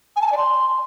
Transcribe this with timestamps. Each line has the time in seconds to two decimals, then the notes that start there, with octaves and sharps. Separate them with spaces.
0.16 G#5
0.21 A5
0.27 G#5
0.32 D5
0.37 C6